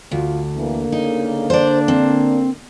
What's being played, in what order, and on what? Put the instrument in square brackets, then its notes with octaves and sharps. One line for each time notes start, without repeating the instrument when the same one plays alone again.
[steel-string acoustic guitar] D2 [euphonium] F4
[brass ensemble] D3 A#3 [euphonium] E3
[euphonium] C#3 [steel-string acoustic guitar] D#4
[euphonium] D4 [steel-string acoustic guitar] C5 D5
[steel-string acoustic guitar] C4